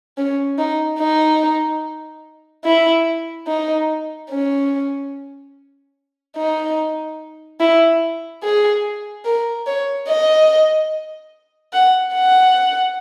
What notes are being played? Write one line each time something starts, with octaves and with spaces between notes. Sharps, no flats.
C#4
D#4
D#4
E4
D#4
C#4
D#4
E4
G#4
A#4
C#5
D#5
F#5
F#5